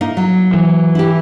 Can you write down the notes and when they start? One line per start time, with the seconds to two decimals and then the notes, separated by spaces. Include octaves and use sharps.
0.01 A#3 D#4 E4
0.17 F#3
0.54 E3
0.95 E4 G4